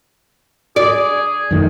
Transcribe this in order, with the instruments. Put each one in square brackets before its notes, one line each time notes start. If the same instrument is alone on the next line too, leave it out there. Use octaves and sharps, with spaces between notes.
[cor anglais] G#4 [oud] D5
[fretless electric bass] F#2 D#3 A3